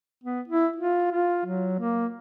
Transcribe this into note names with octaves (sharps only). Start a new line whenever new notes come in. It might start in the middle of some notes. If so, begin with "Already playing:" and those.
B3
E4
F4
F4
F#3
A#3